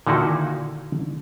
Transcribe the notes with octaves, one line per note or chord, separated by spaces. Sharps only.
A#2 D3 D#3 D#4 E4 F#4